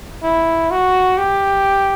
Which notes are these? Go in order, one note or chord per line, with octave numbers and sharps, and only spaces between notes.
E4
F#4
G4